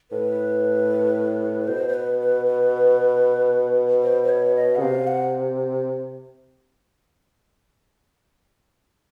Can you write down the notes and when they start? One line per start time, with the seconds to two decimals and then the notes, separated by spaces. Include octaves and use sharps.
0.11 A2 B4
1.68 B2 C5
1.89 C5
1.94 B4
2.20 B4
2.46 B4
4.03 C5
4.23 C5
4.29 C#5
4.56 D#5
4.76 C#3 F#5
4.81 C3 F5
5.07 F#5